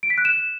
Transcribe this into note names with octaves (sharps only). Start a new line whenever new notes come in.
D7
B6
F#6
E7